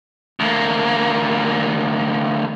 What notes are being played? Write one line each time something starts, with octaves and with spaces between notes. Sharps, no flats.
D2 A#3